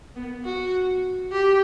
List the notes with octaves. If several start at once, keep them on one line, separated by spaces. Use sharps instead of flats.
B3
F#4
G4